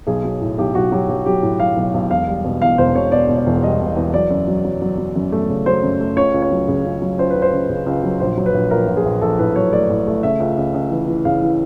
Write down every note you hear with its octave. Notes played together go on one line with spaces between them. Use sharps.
B1 G#4
F#3
A2
B1 G4
B1 F#4
F#3 G4
B1 G4
F#3 G4
A2
F#3 F5
B1
B1
E1 F5
G3
B2
E2 F5
E1 C5
B2 C#5
B2 D5
B2
D5
E1
G3 D#5
B2
E2
F#3 D5
F#2
F#3
F#3
F#3
F#3
F#2
A3
C#3
F#3 C5
F#2
A3
C#2 C#5
C#2
C#5
F#3
C#3
C#2
F#3
C#2 C5
B4
C#2
C5
C#2
C#3
C#2
F#3
A#1 C5
F#3
B4
A#1
A#1 A#4
A#1
G#4
A#1
A#1 A4
A2 B4
F#3 C#5
A3 D5
A2
A3
C#3 E5
C#2
C#2
C#2
E3
E3
C#3 F5
E3